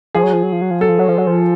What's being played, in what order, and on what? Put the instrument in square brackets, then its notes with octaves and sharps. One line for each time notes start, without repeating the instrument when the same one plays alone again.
[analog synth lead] F3 [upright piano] G#4
[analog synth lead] F#3
F3
F#3
F3
F#3
F3
[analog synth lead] F#3 [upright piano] A4
[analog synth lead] F3
F#3
F3
F#3
F3